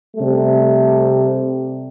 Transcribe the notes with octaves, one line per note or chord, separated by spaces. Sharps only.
C3 G3 A3